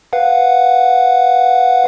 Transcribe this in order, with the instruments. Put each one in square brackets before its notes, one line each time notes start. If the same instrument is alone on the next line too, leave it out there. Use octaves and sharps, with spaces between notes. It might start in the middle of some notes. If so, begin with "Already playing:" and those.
[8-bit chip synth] B4 F5 F#5